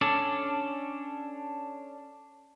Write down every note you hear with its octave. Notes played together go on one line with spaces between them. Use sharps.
C#4 D4 A4 D5